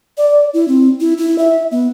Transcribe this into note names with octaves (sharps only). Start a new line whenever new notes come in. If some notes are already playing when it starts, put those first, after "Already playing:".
D5
E4
C4
E4
E4
E5
B3